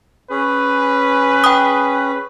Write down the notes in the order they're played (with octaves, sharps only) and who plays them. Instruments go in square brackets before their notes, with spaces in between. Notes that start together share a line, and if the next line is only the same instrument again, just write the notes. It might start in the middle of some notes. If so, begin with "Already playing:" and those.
[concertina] C#4 G#4 [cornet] B4
[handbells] G5 D#6